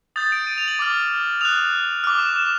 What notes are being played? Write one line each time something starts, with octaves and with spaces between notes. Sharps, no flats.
D#6 G6 A6
D7
D#7
F7
F#7
D6 F6
D#6 F#6 F7
D6 F6
E7
E7